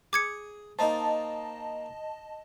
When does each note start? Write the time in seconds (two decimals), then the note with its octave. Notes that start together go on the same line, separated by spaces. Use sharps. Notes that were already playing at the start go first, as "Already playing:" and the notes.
0.13 G#4 D6 G#6 C#7
0.79 A#3 D#4 C5 D#5 A5